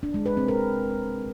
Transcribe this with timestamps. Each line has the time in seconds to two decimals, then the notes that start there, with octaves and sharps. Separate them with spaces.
0.03 D4
0.14 G#3
0.26 B4
0.37 C4
0.48 A#4